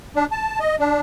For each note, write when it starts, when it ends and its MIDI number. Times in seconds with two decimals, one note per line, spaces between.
0.15 0.25 62
0.31 0.59 81
0.60 0.76 75
0.79 1.00 62